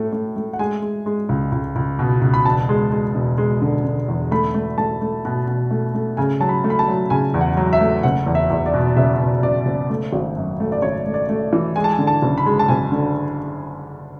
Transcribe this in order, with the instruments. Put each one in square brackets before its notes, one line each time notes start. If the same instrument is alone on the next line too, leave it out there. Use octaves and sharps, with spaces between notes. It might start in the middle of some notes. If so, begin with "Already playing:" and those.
Already playing: [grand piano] A2 A3
A3
A3
F#5
G#3 G#5
G#3
G#3
C#2
C#2
C#2
B2
C#2
B5
E1 A5
G#3
G#3
E1
G#3
D3
D3
E2
A3 B5
A3
A3 A5
A3
B2
B2
A3
A3
C#3 G#5
F#3 A5
B5
A3
B5
A5
F#3
C#3 G#5
E2
F#5
F#3
E5
A3
F#1 F#5
E2
E5
E2
D5
B2
F#1 E5
B2
F#1 D5
F#1
A3
G#1
F#2
A3
D5
G#1 C#5
A3
D5
A3
E3
G#3 G#5
A5
G#5
D3
A5
F#1
B5
G#3
A5
F#1 G#5
D3